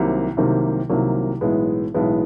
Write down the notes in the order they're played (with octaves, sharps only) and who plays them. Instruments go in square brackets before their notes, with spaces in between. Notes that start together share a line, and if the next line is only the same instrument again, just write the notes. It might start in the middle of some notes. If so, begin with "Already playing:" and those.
Already playing: [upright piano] C2 C3 D#3 F#3 A#3
C2 C3 D#3 F#3 A#3
C2 C3 D#3 F#3 A#3
B1 A2 E3 G#3 B3
B1 A2 E3 G#3 B3